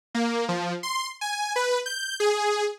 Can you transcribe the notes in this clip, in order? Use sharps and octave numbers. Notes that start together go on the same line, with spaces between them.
A#3
F3
C6
G#5
B4
G6
G#4